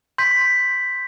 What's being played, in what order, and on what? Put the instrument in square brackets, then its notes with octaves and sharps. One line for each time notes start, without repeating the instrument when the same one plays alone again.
[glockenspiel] C6 G6 B6